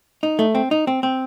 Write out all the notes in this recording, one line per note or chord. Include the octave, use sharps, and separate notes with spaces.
D#4
A3
C4
D#4
C4
C4